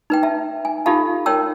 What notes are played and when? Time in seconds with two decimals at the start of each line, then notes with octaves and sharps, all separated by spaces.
0.10 D#4 B4 G5
0.23 E5 A5
0.65 G#5
0.86 D#4 F4 G4 A4 F5 A5
1.26 D#4 A#4 C#5 G5 A5 E6